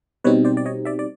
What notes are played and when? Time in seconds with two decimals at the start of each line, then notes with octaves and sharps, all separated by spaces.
0.24 B2 G3 C4 D#4 B4 C#5
0.45 C5 D5
0.57 D5
0.66 C#5 D#5
0.85 D5 E5
0.99 D5